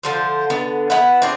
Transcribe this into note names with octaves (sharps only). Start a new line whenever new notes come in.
D3 F3 C5
D3 B3
B3 E4 B4 F#5
C4 D4 G#4